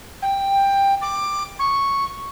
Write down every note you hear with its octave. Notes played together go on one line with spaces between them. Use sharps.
G5
D6
C#6